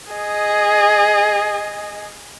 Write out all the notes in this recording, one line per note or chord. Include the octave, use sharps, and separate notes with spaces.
G#4 D#5